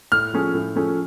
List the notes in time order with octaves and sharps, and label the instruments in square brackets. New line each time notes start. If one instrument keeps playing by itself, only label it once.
[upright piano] A2 [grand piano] F6
[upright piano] F3 A3 C#4 G#4
A2
F3 A3 C#4 G#4